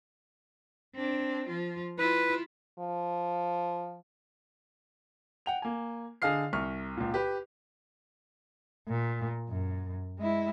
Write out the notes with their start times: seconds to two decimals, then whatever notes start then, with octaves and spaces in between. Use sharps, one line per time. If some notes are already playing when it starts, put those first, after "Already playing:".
0.95 C4 D4
1.48 F3 F4
1.98 E4 F4 B4
2.79 F3
5.46 F#5 G5 F7
5.62 A#3 G#5
6.22 D3 G#4 D#5 F5 F6 C7
6.53 C2 C#6 F6
6.97 C#2 A#2
7.14 G4 B4
8.88 A#2
9.49 F#2
10.19 G#3 E4